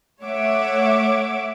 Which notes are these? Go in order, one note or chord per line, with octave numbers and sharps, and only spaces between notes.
A3 C#5 E5 F#5 D6